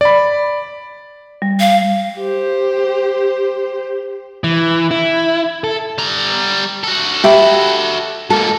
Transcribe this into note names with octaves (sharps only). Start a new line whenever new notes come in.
D5 B5
G3
F5
G4 C5
E3
E4
A4
G3 A#5
F#4 A4
G4 E5 B5
G#2 A#3 A4